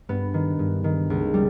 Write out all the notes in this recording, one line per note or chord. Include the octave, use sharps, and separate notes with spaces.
G2 B3
D#3
G2
D#3
C#2
G3